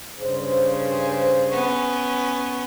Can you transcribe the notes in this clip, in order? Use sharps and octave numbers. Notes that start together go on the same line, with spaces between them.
G2 C#3 C5
G#4
B3 C#4